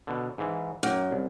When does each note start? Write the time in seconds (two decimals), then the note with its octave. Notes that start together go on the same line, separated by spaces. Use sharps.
0.07 B2 D3
0.38 G#2 E3
0.83 F#2 A#3 G5
1.11 C2